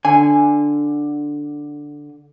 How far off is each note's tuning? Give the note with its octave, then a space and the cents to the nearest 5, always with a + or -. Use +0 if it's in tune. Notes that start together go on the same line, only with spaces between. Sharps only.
D3 +0 G#5 +0